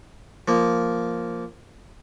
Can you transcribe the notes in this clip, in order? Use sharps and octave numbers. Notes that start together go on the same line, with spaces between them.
F3 A#3